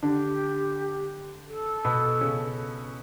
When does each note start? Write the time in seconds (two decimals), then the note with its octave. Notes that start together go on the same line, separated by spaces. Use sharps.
0.03 D3 D4 G4
1.48 A4
1.85 B2 B3
2.21 C#3 C#4